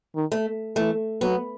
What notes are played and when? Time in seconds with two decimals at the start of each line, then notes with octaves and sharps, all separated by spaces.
0.15 D#3
0.32 A3
0.76 E3 A3
1.21 F#3 B3